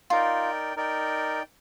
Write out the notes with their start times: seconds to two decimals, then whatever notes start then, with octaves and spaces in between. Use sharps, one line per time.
0.10 D#4 F4 A#4 D5 G5
0.76 D#4 A#4 D5 G5